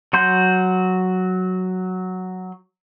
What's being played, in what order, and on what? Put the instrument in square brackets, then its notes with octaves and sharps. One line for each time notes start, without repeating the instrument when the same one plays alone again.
[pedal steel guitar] F#3 F#4 C6 G6